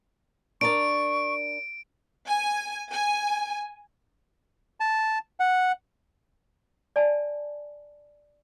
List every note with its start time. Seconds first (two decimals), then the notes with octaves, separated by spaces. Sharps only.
0.61 D4 A#4 D5 C#6 D7
2.27 G#5
2.91 G#5
4.80 A5
5.40 F#5
6.96 D5 G#5 A5